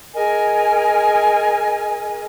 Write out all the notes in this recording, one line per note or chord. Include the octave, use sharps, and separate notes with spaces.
G#4 A#4 D#5 G#5